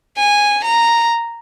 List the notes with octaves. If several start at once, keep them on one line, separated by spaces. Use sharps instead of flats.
G#5
A#5